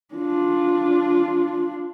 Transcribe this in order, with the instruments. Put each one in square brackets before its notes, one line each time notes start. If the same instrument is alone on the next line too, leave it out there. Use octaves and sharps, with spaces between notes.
[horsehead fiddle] D4 F4